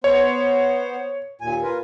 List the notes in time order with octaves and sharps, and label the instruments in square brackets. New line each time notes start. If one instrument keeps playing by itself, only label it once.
[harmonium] B3 C5 [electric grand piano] C#5
[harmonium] D#2 A#2 G#5
F4 A#4 B4